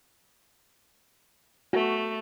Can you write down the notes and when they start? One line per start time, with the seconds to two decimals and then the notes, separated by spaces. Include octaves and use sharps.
1.73 A3 F#4